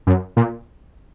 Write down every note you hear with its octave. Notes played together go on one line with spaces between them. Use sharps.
F#2
A#2